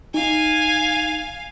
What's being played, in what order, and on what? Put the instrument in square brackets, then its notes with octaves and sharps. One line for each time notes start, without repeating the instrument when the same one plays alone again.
[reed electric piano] D#4 [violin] F5 G#5